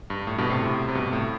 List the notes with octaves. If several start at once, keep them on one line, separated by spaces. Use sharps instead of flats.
G2
A2
G2 B2
A2 C3
C3
G2 B2
A2